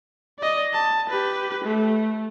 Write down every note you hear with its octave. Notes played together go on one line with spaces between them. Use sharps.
D5 D#5
A5
G4 B4
A3